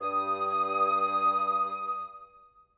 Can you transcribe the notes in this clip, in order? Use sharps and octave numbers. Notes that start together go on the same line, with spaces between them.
G2 D#6